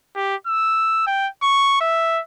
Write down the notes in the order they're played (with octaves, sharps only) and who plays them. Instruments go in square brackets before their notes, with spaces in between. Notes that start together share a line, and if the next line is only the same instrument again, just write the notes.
[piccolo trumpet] G4
E6
G5
C#6
E5